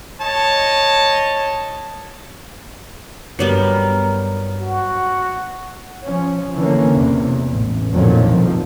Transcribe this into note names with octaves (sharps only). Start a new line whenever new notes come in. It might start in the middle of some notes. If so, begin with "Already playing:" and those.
C#5 D#5 A5
G2 F#3 G3 B3 A#4
F#4
F3 C#4
D3 E3 A#3 C#4
E2 C3
A1
F2 A#2 D3 D#3 F3 F#3
C2 B2 F3